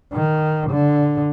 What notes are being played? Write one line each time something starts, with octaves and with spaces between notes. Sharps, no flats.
D#3
D3